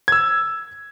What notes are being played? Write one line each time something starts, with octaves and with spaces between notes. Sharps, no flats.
E6 G#6